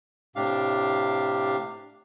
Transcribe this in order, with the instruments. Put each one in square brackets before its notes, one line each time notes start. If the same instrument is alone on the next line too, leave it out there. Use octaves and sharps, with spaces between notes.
[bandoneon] A2 C3 D4 G4 F5